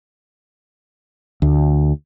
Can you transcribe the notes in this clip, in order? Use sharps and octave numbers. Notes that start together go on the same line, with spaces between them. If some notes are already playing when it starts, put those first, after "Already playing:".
D2